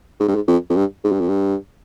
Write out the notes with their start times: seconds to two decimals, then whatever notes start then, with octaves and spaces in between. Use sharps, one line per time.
0.20 G#2
0.28 G2
0.35 G#2
0.48 F2
0.70 F2
0.76 G2
1.04 G#2
1.12 G2
1.20 F2
1.28 G2